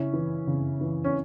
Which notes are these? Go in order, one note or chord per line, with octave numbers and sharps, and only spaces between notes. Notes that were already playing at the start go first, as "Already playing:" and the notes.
Already playing: C#3 C#4 E4
E3
C#3
E3
C#4